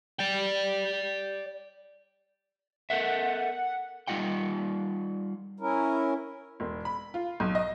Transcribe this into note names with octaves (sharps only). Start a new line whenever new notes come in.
D5 G5
A4 A#4 E5 F#5
G3 D#4 F4 F#5 G5
C#4 E4 A#4
E1
B5
F4
B1
D#5